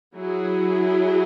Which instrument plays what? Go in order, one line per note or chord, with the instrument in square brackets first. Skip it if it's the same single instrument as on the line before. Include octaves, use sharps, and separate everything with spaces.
[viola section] F#3 E4 G#4